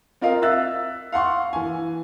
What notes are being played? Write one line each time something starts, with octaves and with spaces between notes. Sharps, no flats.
C4 F4 A#4 D#5 F5
E5 E6 F#6 A6
F5 F#5 C6 C#6
E3 G#5